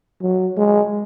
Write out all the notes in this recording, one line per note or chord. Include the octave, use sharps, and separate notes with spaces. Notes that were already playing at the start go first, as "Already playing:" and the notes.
F#3
G#3